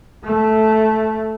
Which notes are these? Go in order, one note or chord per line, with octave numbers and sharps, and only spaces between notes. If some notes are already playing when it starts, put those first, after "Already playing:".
A3